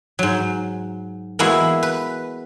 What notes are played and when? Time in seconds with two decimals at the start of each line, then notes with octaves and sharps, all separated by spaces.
0.19 G#2 F#3
1.39 E3 G#3 A#3 B3 E4 F#4
1.83 B4